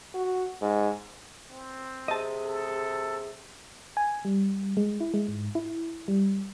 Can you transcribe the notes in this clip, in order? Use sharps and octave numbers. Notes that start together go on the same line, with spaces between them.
F#4
G#2
C4
C3 G#4 D#5 A5
A4
G#5
G3
G#3
E4
G#3
G#2
E4
G3